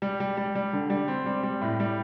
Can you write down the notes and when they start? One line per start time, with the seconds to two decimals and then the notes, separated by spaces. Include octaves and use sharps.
0.02 G3
0.20 G3
0.37 G3
0.55 G3
0.73 D3
0.90 G3
1.08 C4
1.26 G3
1.43 G3
1.62 A2
1.80 G3